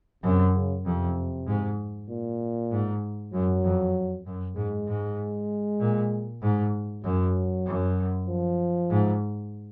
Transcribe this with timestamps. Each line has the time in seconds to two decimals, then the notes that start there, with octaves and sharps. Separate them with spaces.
0.24 F#2 C3
0.55 C#3
0.85 F2 C3
1.47 G#2
2.10 A#2
2.71 G#2
3.34 F#2 F#3
3.64 F2
4.26 F#2
4.56 G#2 G#3
4.88 G#2
5.80 A#2
6.42 G#2
7.04 F#2 F#3
7.66 F#2
8.28 F3
8.90 G#2